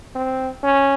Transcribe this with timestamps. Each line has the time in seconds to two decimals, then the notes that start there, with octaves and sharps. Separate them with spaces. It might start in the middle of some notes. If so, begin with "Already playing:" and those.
0.15 C4
0.63 C#4